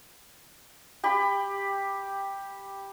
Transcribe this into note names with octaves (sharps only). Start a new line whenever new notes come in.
G4 B5